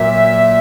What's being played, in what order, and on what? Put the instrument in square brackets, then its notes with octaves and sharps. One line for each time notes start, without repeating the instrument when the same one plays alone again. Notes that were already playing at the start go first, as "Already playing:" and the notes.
Already playing: [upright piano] A#2 F#3 A#3 [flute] E5